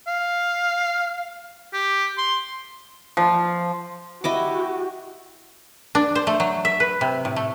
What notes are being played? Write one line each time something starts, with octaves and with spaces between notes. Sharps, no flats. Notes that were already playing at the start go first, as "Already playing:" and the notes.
F5
G4
C6
F3
E4 F#4 G4 D#5 D6
D4
C5
A3
F#3
E5
B4
C3
A2
A3